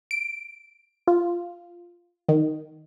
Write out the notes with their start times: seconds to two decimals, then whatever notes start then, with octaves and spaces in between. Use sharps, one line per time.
0.11 D7
1.08 F4
2.29 D#3